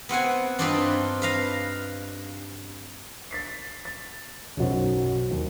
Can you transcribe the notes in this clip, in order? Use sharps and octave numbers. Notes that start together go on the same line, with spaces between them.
B3 C4 F#5 G#5
G2 C4 D4 D#4 F4 B4
B4 F5 A#5
A6 B6 C7
A6
B1 F#2 F#3 F#4 C5
D#2